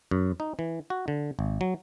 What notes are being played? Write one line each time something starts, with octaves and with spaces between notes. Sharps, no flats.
F#2
D#4
E3
F#4
D3
G#1
F#3